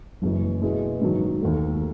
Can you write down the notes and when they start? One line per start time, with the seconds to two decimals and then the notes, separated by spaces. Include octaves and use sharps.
0.22 F#1 F#2 E3
0.61 B2 G#3 B3 E4 G#4
1.01 G#2 D#3 F#3
1.42 D#2 D#3 A3